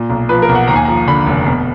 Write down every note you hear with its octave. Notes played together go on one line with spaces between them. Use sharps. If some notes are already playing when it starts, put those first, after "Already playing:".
Already playing: A#2
B1
F3 B4
A#4
B1
F#5
D#2 A#5
G#5
F3 A#5
D3 B5
F1
B2